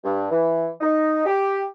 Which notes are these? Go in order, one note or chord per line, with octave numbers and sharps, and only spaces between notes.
G2
E3
D#4
G4